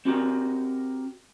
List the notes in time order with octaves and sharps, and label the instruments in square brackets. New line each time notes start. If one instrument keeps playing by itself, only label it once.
[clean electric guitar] C4 F#4 G4 A#4